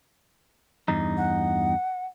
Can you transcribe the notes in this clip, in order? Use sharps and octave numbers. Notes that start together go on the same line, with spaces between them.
E2 G2 D#4
F#5